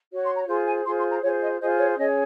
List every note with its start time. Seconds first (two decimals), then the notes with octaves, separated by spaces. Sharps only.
0.10 F#4 C#5
0.23 C6
0.35 A#5
0.48 F4 G#4 C5 C6
0.66 G#5
0.84 F4 G#4 C5 C6
0.98 C6
1.10 A#5
1.22 F4 G#4 C5 C#5
1.40 D#5
1.59 F4 G#4 C5 D#5
1.78 C#5
1.97 C#4 G#4 C#5 D#5